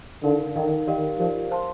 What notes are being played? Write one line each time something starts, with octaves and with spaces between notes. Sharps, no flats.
D3 D#4 A#4 F5
D#3 D#4 A#4 F5
D#3 G4 A#4 D5 F5
F3 G4 A#4 D5 F5
C5 F5 A5 C6